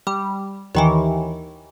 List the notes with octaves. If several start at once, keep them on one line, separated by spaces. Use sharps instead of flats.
G3
D#2 D#3 E3